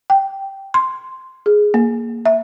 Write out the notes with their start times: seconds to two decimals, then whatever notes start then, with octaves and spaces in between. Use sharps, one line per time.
0.10 G5
0.74 C6
1.46 G#4
1.74 A#3
2.26 E5